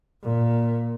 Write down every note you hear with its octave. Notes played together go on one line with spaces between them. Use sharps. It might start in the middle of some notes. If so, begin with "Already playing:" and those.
A#2